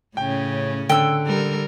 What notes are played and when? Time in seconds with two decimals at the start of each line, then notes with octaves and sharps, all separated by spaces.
0.17 A2 C#3 C#4 G5
0.89 D3 G5 E6
1.26 G3 A#4